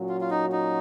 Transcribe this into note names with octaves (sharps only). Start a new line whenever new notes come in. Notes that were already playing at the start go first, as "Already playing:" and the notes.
Already playing: A#2 F#3 C#4 F#4
F4
F4
D#4
D#4